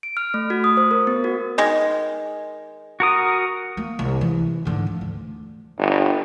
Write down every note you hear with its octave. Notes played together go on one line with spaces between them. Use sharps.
D7
F6
A3
F#4
D#6
C5
A#4
B3
F#4
D#3 G#3
F#4 A#4 D#6
A#3
C2
E3
G#2 D3
F3
D2
G1